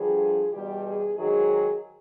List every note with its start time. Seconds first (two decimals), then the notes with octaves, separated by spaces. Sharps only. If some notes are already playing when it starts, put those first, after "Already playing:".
Already playing: G2 D3 F3 G#4
0.53 E2 B2 G3 G4
0.85 G#4
1.17 G#2 D#3 F#3 G#4